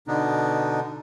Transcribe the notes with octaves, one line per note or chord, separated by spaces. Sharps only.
B2 D3 B3 D4 D#4